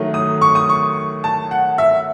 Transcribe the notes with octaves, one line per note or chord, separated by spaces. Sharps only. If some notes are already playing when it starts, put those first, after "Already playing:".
Already playing: D#3 F#3 A3
D#6
C#6
D#6
C#6
A5
F#5
E5